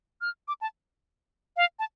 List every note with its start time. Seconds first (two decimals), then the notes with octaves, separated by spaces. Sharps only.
0.21 F6
0.48 D6
0.61 A5
1.57 F5
1.79 A5